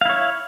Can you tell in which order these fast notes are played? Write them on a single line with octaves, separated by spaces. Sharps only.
F5 E4 C#5